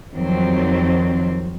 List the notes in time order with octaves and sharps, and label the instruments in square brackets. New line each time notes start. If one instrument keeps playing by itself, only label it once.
[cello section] F2 D#3 F#3 G3 C4